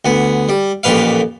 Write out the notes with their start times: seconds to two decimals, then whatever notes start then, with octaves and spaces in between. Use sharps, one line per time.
0.05 D2 B3
0.49 G3
0.83 A1 F2 A#2 B4 F5